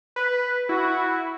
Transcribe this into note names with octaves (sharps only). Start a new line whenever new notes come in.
B4
E4 F#4